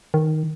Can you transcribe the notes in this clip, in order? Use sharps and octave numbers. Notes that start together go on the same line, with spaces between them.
D#3